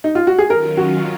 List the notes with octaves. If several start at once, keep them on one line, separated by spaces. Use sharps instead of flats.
D#4
F4
F#4
G#4
D#3 F#3 C#4 F4 A#4
F#4